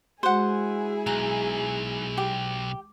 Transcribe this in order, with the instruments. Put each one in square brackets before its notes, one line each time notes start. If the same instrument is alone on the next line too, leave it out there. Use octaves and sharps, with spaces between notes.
[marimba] G#3 F#4 [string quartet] E4 G#4 G#5 [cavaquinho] C5 F#5
[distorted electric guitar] B1 [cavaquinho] A#5
[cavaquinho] G4